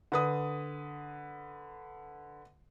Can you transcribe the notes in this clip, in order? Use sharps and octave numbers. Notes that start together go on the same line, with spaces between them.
D3 B4 D#6